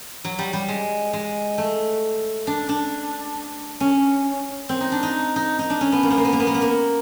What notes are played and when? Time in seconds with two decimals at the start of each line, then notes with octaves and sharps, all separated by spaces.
0.25 F#3
0.39 G3
0.53 G3
0.68 G#3
1.13 G#3
1.58 A3
2.47 D4
2.69 D4
3.80 C#4
4.69 C4
4.81 D#4
4.92 D4
5.03 D#4
5.36 D#4
5.59 D#4
5.70 D4
5.81 C#4
5.92 B3
6.03 A#3
6.10 B3
6.17 A#3
6.25 B3
6.33 A#3
6.40 B3
6.47 A#3
6.54 B3
6.62 A#3